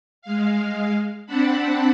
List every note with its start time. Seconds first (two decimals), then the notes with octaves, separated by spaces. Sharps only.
0.22 G#3 F5
1.27 C4 D4 F#5 A5 B5